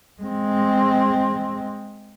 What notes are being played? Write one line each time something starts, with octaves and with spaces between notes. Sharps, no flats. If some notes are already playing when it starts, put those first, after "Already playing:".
G#3 C4